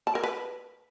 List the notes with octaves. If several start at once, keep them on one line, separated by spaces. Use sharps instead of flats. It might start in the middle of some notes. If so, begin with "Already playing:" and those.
A5
A#4
B4